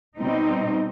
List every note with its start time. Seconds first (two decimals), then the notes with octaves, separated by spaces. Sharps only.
0.18 B2 G3 C4 D#4